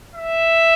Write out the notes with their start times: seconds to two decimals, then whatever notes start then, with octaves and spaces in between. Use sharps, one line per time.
0.15 E5